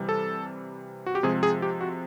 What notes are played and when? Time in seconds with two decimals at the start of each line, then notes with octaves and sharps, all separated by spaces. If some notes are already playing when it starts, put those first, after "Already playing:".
Already playing: C3 E3 G3
0.09 A4
1.06 F#4
1.15 G4
1.23 C3 F3 G#3 C4 G#4
1.43 G#4
1.62 G4
1.81 F#4